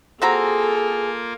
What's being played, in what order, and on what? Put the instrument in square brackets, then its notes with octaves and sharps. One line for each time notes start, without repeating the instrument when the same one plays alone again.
[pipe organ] A#3 F4 [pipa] C4 F#4 A#5 [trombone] G#4 [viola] A4